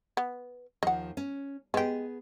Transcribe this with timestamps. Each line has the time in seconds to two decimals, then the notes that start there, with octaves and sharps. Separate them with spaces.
0.17 B3
0.83 D#2 F3 D#5 F#5
1.17 C#4
1.74 G#3 B3 G4 G#4